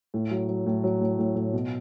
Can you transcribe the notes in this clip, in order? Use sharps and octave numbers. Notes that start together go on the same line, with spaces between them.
A2
F#3
F#3
A2
F#3
A2
A2
A2
B2